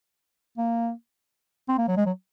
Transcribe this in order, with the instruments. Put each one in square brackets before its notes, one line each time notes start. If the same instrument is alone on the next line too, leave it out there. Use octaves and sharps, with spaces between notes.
[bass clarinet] A#3
C4
A#3
F#3
G#3
F#3